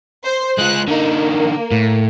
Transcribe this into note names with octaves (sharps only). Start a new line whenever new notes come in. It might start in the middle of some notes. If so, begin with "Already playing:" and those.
C5
G#3 F4 F#6
D3 A#3 D#4
A2